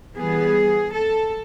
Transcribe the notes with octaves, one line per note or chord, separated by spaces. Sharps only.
E3 G3 B3 G#4
A4